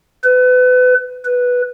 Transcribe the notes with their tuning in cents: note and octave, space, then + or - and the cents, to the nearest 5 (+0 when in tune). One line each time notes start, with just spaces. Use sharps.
B4 +30
B4 -5